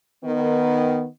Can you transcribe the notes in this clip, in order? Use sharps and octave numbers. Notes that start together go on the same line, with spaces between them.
D#3 B3